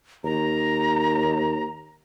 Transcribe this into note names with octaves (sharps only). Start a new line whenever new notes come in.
D#2 A#5